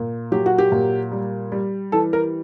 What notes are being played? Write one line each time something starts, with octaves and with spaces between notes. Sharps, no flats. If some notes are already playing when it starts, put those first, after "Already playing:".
Already playing: A#2
F#3 G4
F#4
G4
A#2
G3
G3
E3 A4
A#4